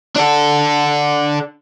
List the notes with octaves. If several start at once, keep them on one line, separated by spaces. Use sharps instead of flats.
D4 A4